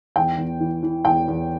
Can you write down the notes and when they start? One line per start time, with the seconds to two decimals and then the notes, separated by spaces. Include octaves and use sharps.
0.16 E2 G5
0.38 E2
0.60 E3
0.83 E3
1.05 E2 G5
1.28 E2